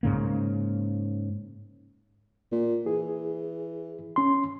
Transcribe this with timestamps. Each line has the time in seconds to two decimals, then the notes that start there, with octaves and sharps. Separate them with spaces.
0.03 G#2 C#3 A#3
2.52 A#2
2.86 E3 G#4
4.16 C#4 C6